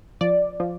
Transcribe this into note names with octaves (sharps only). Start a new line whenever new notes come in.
F3 D5
F3